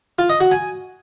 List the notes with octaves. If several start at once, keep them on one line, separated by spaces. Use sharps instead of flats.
F4
D#5
F#4
G#5